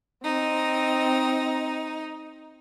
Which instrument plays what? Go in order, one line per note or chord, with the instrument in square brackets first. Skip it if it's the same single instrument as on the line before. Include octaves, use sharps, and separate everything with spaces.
[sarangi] C4 [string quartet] D#4